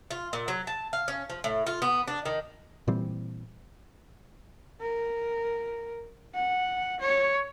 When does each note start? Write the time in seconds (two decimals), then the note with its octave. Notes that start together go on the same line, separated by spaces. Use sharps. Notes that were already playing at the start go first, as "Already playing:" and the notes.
0.11 F4
0.33 A#2
0.48 F#3
0.67 A5
0.93 F5
1.08 C#4
1.30 F3
1.44 A2
1.67 F4
1.82 B3
2.08 D4
2.26 D#3
2.88 A#2 E3 G3 C4
4.81 A#4
6.35 F#5
7.00 C#5